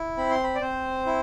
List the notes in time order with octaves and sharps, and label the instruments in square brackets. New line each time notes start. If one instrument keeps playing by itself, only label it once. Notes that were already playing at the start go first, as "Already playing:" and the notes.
Already playing: [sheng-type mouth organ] E4
C4 B5
C6
B5
D5
C4 C5
E4